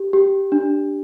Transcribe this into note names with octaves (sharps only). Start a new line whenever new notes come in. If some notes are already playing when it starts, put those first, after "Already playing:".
Already playing: G4
G4
D4